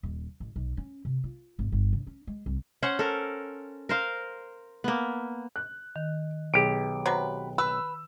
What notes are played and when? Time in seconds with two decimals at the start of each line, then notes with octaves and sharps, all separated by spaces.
0.03 D#1
0.40 A1
0.56 B1
0.77 C#4
1.05 C3
1.24 F4
1.59 G#1
1.72 G1
1.93 C#3
2.07 C#4
2.27 G#3
2.46 C2
2.83 C#4 C5 F#5
2.99 A4 A#4
3.89 A#4 C5 F5
4.84 A#3 B3
5.56 F#6
5.96 D#3
6.54 B1 G4 G#4 D7
7.06 C3 F#3 B4
7.58 B4 E6